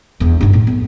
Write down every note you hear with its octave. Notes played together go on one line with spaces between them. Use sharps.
E2 D3
G2 D#4
A2
B3